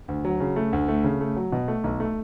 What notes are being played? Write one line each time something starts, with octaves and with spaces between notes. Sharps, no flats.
D2
F#3
C#3
A3
D2
A3
C#3
A3
F#3
B2
A3
B1
A3